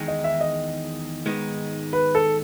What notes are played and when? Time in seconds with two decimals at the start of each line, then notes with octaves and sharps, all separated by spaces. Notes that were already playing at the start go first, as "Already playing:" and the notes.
Already playing: E2 D#3 G#3 D#4
0.08 D#5
0.24 E5
0.41 D#5
1.26 G#2 D#3 G#3 B3 D#4
1.93 B4
2.15 A4